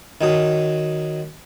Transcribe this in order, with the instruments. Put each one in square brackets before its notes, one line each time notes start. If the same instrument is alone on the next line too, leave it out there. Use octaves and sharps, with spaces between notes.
[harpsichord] D#3 F#3 D#6